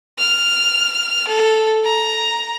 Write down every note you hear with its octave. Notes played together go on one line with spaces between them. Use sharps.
F6
A4
A#5